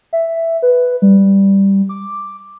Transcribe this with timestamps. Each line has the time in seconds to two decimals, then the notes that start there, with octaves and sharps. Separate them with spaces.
0.13 E5
0.62 B4
1.02 G3
1.89 D6